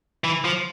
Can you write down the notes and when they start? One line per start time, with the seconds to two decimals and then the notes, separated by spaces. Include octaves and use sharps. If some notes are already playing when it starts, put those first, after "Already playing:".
0.24 E3
0.45 F3